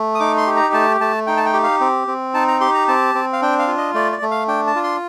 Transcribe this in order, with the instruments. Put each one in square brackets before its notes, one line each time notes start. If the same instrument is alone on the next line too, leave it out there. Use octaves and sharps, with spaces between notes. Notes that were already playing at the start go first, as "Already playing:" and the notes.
Already playing: [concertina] A3
D#6
D#4 D6
C6
G4
A#5
A3 A5
A3 A5
D#4 G5
A5
G5
G4
F5
C4
C4
D#4 A5
A#5
G4 C6
A#5
C4 A5
C4
F5
D4 G5
F5
F4
D#5
A3 D5
D5
A3
F5
D4 G5
A5
F4
C6